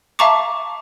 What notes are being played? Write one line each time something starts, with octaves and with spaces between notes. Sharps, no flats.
E5 F5 A5 A#5 C#6 D6